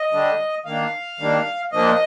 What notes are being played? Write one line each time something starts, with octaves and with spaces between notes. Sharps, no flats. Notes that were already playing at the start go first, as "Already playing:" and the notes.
Already playing: D#5
D3 G3 D4
D#3 A#3 D4 F5
D#3 G3 A#3 D4
A#2 F3 A#3 D4 D#5